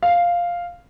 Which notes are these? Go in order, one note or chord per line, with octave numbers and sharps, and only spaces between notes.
F5